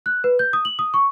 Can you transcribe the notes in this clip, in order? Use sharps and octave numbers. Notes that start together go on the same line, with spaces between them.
F#6
B4
G6
D#6
F#7
D#6
C#6